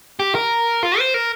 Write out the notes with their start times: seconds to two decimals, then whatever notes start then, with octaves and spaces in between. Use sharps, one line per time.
0.20 G4
0.35 A#4
0.83 F4
0.99 C5
1.14 A#4